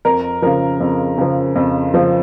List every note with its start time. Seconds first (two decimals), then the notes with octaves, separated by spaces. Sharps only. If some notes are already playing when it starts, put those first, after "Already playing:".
0.05 F2 A#4
0.42 C#3 F3 A#4
0.80 F2
1.18 C#3 F3
1.56 F2
1.94 C#3 F3